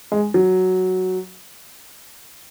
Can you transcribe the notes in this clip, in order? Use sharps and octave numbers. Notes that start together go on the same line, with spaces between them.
G#3
F#3